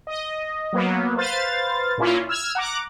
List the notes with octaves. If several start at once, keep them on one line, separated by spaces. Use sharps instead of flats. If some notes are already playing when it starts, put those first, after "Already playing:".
D#5
F#3 A#3 B3
B4 C5 F5 A6
A#2 A#3 C#4 E4 F4
E6 F6 G#6
F#5 A#5 D6